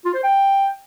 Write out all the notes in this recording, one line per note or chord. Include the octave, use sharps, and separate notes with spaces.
F4
C5
G5